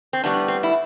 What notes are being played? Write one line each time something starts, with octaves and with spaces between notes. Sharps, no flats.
C4
A2 G3 B3 D4
C4
E4